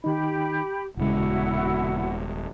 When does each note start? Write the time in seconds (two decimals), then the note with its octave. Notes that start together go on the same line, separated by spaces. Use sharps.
0.04 D#3 D#4 G4 B5
0.97 D#1 C#2 C#3 G#3 E4 F#4 F#5